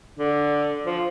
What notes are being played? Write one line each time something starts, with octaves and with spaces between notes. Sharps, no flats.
D3
F3